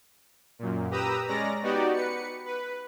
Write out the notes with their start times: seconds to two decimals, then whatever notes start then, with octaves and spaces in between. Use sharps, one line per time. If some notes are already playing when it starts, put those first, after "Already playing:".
0.59 F#2 A#2
0.91 G4 B4 A#5 D#6 E6
1.27 G#3 C#4 D5 A#5 A#6
1.63 B3 D#4 F#4 G4 D5
1.94 B4 C#7
2.45 B4